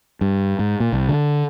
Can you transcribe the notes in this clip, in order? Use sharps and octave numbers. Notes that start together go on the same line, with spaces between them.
G2
G#2
A#2
C2
D3